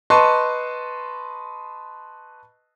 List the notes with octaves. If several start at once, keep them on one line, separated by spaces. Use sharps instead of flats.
B4 D#5 A5 C6 C#6